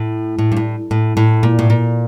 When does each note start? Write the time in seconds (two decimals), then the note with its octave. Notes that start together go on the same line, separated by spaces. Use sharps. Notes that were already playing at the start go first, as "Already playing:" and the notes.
Already playing: A2
0.39 A2
0.52 G2
0.57 A2
0.91 A2
1.17 A2
1.43 A#2
1.59 A2
1.70 A#2